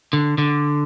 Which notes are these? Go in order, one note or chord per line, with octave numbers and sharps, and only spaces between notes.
D3
D3